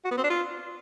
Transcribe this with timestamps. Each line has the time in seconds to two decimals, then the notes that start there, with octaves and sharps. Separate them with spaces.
0.05 F#4
0.11 B3
0.17 C4
0.24 D4
0.30 F4